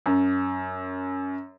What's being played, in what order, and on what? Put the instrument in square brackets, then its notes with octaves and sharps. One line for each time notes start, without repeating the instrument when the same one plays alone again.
[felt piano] F#2